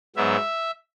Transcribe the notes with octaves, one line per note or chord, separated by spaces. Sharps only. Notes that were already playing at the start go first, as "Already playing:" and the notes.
G#2 F#3 B3 E5